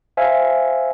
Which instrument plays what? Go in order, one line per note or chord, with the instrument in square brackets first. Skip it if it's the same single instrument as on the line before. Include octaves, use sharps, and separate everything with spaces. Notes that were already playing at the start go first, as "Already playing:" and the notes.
[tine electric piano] C5 E5 F5 G#5